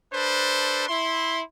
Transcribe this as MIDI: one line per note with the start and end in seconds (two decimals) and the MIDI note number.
0.13 0.85 62
0.13 0.85 69
0.13 0.85 71
0.13 0.85 72
0.88 1.41 64
0.88 1.41 84